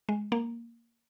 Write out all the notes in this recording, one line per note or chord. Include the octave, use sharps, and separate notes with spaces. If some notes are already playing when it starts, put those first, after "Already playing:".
G#3
A#3